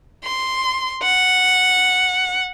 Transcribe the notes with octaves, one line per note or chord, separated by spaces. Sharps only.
C6
F#5